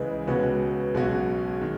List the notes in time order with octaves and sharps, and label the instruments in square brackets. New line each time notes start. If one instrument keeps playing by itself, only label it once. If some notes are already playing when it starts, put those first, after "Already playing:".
Already playing: [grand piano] C#2 C#3 E3 G#3 [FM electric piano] B4 D#5
[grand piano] C#2 B2 G#3 C#4 F#4 [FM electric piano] B4
[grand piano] B1 B2 G#3 C#4 F#4 [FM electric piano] G#4
[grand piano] D#3